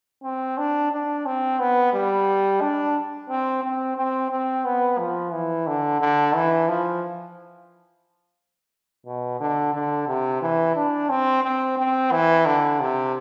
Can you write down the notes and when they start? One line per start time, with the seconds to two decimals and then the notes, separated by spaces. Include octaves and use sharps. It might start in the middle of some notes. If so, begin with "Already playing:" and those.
0.23 C4
0.58 D4
0.91 D4
1.26 C4
1.59 B3
1.93 G3
2.61 D4
3.29 C4
3.63 C4
3.97 C4
4.31 C4
4.65 B3
4.99 F3
5.32 E3
5.67 D3
6.01 D3
6.35 E3
6.68 F3
9.06 B2
9.40 D3
9.73 D3
10.08 C3
10.42 E3
10.76 D4
11.10 C4
11.44 C4
11.77 C4
12.12 E3
12.45 D3
12.80 C3